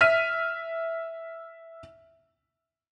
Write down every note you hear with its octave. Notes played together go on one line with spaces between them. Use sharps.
E5 F6 B6 D#7